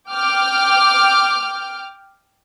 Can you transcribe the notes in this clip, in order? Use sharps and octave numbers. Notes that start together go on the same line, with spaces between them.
G5 D6 F6